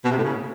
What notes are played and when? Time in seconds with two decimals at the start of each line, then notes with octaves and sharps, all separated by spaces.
0.04 B2
0.11 C3
0.17 A2
0.24 C#3